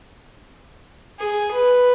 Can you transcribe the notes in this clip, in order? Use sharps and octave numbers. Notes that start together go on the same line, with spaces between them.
G#4
B4